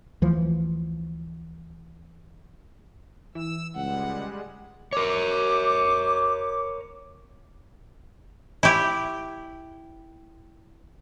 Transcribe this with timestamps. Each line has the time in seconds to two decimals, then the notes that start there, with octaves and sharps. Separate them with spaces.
0.22 D2 E3 F3
3.35 E3 E6
3.76 C#2 G3 G#3 F#5
4.93 A#4 C#5 D6
8.63 E4 G4